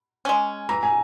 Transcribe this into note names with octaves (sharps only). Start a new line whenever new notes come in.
G#3 C#4
E3 A#5
G#5